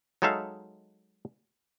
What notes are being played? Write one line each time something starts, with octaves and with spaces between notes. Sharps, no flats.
F#3 G#3 D#4 A4 E5 F5